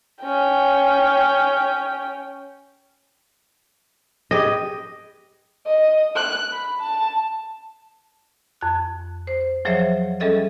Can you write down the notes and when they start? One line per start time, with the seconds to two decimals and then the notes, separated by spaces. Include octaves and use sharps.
0.24 C#4 G5
4.31 G4 G#4 B4 D#5
5.66 D#5
6.16 F#6
6.52 B5
6.80 A5
8.61 F2 F#6
9.27 C5
9.65 F3 F#3 G#4 C5 C#5 E5
10.20 G3 C#4 G#4 A4 D#5 E5